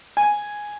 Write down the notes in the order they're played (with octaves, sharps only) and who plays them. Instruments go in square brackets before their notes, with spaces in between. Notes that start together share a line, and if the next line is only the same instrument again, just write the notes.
[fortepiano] G#5